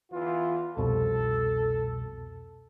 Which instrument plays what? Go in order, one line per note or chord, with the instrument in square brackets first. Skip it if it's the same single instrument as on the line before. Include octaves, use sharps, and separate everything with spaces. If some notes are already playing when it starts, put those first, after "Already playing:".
[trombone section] E2 E3 F4
[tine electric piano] C2 F2 B2 [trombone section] A4